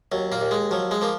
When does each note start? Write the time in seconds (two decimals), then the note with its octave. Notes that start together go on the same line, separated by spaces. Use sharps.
0.12 D#2 F#3
0.32 A#2 A#3
0.41 D#2
0.51 G#3
0.71 F3 F#3
0.91 G#3
1.01 F3 A#3